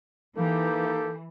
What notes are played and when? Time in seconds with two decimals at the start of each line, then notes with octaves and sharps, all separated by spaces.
0.37 E3 A#3 D#4 G4 A4